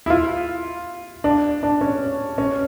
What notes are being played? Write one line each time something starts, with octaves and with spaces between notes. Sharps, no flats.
E4
F4
D4
D4
C#4
C#4